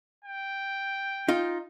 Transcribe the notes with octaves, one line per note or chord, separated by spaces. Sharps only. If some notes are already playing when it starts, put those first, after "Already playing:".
G5
D#4 F4